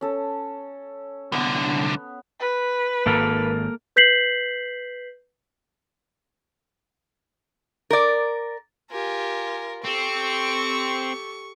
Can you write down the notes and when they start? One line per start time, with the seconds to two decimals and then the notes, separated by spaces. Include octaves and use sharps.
0.01 C#4 A4
1.32 C2 D3 B3
2.40 B4
3.06 G#1 G#2 A#3 A4 A#4
3.96 B4 G6 B6 C7 F#7
7.90 A#4 D5
8.92 F4 G4 A#4 G#5
9.84 C4 G4 A4 C#6